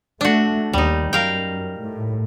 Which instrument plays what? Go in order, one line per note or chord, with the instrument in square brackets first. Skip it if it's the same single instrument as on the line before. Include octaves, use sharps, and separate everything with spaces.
[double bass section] A3 [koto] D4 F#4
[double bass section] D#2 [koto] G3 D#4
[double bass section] F#2 [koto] A#4 F5 G5
[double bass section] A2